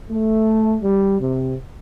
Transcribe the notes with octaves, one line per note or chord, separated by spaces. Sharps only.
A3
G3
C3